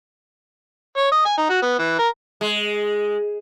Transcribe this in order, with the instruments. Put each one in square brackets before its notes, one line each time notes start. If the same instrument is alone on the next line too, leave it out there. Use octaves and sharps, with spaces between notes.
[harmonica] C#5
D#5
G#5
D#4
F#4
B3
E3
A#4
[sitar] G#3